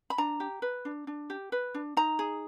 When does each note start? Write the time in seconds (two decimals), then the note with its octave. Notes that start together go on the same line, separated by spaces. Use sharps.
0.10 B5
0.18 D4 A#5
0.40 G4
0.62 B4
0.85 D4
1.07 D4
1.30 G4
1.52 B4
1.75 D4
1.97 D#4 A#5
2.19 G#4